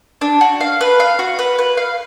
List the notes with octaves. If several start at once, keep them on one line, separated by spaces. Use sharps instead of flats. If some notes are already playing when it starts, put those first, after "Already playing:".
D4
F#4
F5
B4
F5
F#4
B4
B4
F5